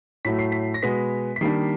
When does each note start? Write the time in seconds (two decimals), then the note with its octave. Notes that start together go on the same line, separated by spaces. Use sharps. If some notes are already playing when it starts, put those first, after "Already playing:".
0.25 A2 F#3 A3 B6
0.39 C7
0.52 B6
0.74 A#6
0.82 B2 G#3 B3 B6
1.36 B6
1.41 D#3 G3 A#3 D4 C7